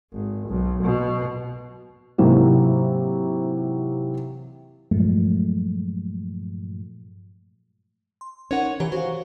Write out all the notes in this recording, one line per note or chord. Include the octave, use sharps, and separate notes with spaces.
G#1
B1
B2
G#2 C3 E3 F#3 A#3
G2 A#2 F3 F#3 G#3 A3
C6
C#4 D#4 A#4 C#5 F#5
E3 G4 C#5 A#5
F#4 C5 F5